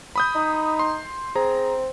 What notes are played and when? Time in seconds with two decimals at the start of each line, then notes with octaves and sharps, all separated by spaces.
0.16 B5 D#6 G6
0.35 D#4
0.79 C6
1.36 C4 G#4 A#5